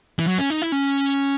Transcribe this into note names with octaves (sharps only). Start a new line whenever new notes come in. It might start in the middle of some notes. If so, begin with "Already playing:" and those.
E3
F#3
C#4
D#4
E4
C#4